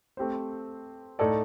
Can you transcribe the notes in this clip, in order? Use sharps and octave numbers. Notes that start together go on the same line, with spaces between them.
A3 C4 G4 C5
A2 A3 D#4 A4 D5